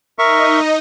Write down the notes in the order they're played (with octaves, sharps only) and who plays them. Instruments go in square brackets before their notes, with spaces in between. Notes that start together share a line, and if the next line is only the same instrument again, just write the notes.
[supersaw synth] D#4 D#5 [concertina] A#4 E5 C#6